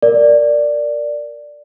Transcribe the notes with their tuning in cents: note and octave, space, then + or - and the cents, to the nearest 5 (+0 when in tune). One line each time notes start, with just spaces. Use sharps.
A#4 -5 D5 +0